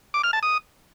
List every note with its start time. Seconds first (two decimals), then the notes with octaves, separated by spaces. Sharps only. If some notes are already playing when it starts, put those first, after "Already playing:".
0.14 D6
0.24 F6
0.33 A5
0.43 D#6